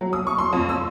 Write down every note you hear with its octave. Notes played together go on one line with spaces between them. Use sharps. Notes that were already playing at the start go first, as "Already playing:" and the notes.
F#3
D#6
C#6
C6
F2
E6